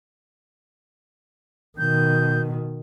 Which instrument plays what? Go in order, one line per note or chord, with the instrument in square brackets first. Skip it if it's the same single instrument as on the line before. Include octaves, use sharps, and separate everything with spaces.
[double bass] B2 D#3 [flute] G6